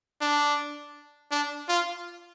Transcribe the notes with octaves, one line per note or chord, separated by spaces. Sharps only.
D4
D4
F4